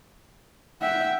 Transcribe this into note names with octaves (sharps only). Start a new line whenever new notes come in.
E5 F#5 G5